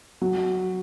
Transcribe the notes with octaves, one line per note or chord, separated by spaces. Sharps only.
F#3